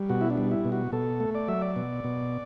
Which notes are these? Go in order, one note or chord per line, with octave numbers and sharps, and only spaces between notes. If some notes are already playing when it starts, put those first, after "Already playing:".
Already playing: G3
B2 F#4
E4
D4
G3
E4
B2
F#4
B2 A4
A3
D5
F#3 E5
D5
B2
B2